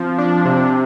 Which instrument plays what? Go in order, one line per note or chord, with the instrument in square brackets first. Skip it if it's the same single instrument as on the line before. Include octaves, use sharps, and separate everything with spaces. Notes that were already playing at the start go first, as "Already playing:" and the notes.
Already playing: [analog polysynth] F3 [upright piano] C4
[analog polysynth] D4
C3